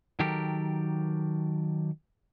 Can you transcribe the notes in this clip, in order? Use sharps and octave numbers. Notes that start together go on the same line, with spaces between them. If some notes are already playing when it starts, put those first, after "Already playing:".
D#3 F#3 G4 A4 A#4